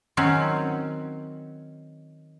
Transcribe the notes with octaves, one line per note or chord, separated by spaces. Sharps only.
D#3 F#3 C4 C#4